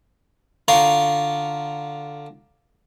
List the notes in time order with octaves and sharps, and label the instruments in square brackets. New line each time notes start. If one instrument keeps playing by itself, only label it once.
[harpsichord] D3 F4 F5 A#5 C#6